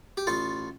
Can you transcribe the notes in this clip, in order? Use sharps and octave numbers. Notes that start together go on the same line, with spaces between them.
G4
A1 F4 A4